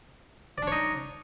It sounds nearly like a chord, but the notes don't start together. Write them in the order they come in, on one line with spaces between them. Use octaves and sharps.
D5 D4 C#5 D#4